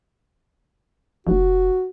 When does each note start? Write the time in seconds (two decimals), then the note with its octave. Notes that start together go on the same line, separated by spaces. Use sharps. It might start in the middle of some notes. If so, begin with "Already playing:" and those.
1.27 F1 F#4